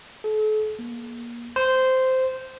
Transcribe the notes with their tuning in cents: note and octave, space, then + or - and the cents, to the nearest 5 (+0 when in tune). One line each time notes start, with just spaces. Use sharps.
A4 -40
A#3 +30
C5 -10